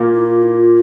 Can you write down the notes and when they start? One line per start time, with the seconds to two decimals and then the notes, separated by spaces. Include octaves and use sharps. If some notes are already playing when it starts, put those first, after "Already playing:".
Already playing: A#2 A#3
0.14 E4
0.26 F4
0.40 E4
0.56 F4